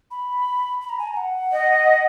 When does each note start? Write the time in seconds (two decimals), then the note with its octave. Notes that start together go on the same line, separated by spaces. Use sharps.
0.11 B5
0.81 B5
0.89 A#5
0.99 G#5
1.07 A#5
1.17 F#5
1.52 D#5